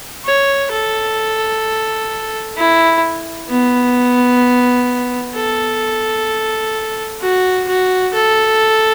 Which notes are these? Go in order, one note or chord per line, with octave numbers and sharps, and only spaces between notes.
C#5
A4
E4
B3
A4
F#4
F#4
A4